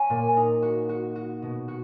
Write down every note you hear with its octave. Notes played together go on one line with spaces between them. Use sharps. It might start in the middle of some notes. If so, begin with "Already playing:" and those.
Already playing: C#4 G#5
A#2
D#4
F#4
F#4
F#4
B2
F#4